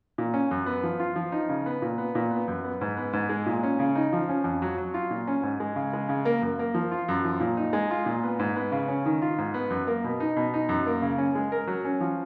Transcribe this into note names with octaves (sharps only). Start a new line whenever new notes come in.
A#2
C#4
F#2
B3
F3
F4
F3
D#4
C#3
B3
A#2
B3
A#2
B3
F#2
B3
G#2
B3
G#2
G#3
A#2
C#4
C#3
D#4
F3
C#4
F2
F#3
F#3
F4
A#2
C#4
G#2
G#3
C#3
G#3
C#3
A#3
F#2
A#3
F3
F4
F#2
F3
A#2
D#4
G#3
F4
A#2
B3
G#2
B3
C#3
C#4
D#3
F4
G#2
B3
F#2
A#3
B2
D#4
B2
D#4
F#2
A#3
C#3
C#4
G#3
A#4
F#3
C#4
F3